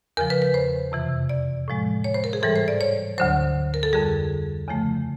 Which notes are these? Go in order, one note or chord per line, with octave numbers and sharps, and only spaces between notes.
E2 C#3 F3 A#4
B4
B4
C5
F2 C3 E3
D5
A2 F3 G#3
C#5
C5
A#4
G#4
G#2 E3 G3 A4
C5
D5
C#5
D2 D3 F#3 C5
A#4
A4
F2 D3 G3 G#4
E2 C#3 F3 A3